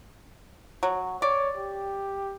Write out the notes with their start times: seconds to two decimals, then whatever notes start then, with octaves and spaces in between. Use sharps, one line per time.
0.83 F#3
1.22 C#5 D5
1.57 G4